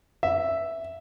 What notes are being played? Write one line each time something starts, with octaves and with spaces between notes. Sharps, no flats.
E5